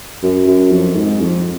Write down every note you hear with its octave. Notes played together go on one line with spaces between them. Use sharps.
F#2
F#2
F2
G#2
F2